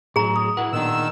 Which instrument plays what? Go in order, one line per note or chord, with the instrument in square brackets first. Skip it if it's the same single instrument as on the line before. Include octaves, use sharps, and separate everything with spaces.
[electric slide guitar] A2 F#3 [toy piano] G#4 A#5
[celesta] D#6
[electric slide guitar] E4 B4 [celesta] F#5
[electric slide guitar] A#2 B3 D4 [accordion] D#3 E6